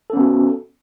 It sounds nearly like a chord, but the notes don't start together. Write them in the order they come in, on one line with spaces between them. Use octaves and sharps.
A4 C#4 B3 F#4